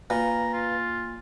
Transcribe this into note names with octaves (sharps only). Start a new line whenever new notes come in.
A#2 B4 F5 A#5
F4